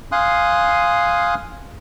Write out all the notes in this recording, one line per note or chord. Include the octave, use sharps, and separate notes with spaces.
F5 G#5 C6 D#6 F#6